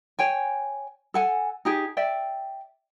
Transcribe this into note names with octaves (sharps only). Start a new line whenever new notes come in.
C#5 G5 G#5
A4 F#5 G#5
D#4 G4 G#4
D5 E5 G5